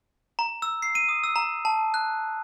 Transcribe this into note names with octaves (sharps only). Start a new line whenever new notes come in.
A#5
E6
C7
D#7
D#6
E6
A#5
A5
F#6